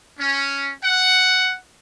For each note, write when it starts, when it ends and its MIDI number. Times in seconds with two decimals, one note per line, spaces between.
0.18 0.70 61
0.83 1.57 78